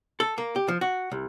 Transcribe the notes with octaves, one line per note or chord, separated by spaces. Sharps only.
A4
A#3
G4
F3
F#4
C2